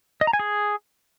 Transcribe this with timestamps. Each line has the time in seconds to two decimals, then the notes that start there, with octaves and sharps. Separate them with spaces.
0.21 D#5
0.27 A#5
0.33 G#5
0.39 G#4